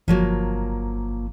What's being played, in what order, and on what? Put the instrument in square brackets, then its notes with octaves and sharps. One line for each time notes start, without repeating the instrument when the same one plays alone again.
[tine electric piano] G1 [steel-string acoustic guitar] F3 F#3 A#3